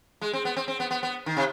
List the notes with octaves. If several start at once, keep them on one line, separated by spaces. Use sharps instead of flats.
G#3
C4
B3
C4
C4
B3
B3
B3
D#3
C3